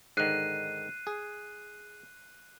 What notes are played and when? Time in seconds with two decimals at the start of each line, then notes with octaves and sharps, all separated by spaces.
0.17 G#2 D3 D#3 F#6 C7 D#7
1.07 G#4